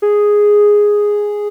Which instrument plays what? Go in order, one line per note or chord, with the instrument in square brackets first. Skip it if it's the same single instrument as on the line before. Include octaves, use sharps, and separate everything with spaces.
[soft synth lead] G#4